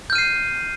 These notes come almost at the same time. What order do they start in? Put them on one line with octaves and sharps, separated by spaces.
G6 F6 D#7 C7